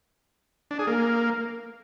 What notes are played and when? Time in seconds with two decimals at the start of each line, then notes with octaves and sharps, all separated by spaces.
0.71 D4
0.79 G#4
0.87 A#3